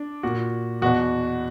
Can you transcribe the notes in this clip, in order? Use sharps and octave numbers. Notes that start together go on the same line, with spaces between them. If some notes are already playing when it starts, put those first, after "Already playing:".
Already playing: D4
A#2 F#4
E2 B2 F#4